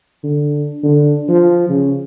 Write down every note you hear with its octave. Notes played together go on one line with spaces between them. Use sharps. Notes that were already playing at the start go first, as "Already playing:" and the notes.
D3
D3
F3
C#3